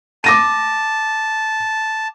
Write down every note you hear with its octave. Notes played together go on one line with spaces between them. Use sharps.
A5 D6 A#6 D#7